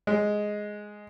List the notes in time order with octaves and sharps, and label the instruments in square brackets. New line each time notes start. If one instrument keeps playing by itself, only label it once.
[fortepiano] G#3